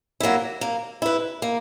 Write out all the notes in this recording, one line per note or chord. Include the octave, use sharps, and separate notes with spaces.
F#3 A#3 E4
A#3
E4 B4
A#3